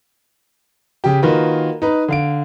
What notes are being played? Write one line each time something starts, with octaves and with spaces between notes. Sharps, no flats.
C#3 G4
D#3 A#3 F4 F#4 B4
D#4 B4
D3 F5 D7